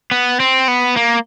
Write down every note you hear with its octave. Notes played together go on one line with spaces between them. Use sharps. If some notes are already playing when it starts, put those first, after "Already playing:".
B3
C4
B3
A#3